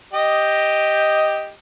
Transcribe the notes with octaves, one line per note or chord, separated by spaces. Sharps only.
G4 D#5